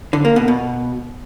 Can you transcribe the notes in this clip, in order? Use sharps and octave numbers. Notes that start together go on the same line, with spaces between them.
D3
A#3
B2
B2